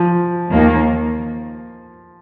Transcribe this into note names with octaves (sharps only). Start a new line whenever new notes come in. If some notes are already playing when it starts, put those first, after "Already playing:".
Already playing: F3
D#2 D#3 A#3